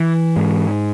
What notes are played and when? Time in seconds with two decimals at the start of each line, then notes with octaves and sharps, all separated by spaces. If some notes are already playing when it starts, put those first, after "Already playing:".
Already playing: E3
0.36 G#2